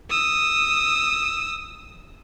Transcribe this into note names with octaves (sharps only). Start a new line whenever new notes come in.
D#6 E6